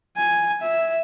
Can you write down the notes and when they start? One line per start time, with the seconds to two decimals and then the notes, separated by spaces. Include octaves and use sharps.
0.17 G#5
0.62 E5